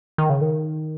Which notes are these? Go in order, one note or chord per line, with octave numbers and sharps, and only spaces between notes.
D#3
C#3
D#3